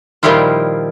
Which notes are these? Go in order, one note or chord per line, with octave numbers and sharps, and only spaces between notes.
A#2 D#3 F3 G3 E4 F4